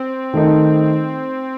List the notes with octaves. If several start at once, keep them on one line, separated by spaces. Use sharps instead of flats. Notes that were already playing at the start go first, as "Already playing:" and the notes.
Already playing: C4
D#3 A3 D#4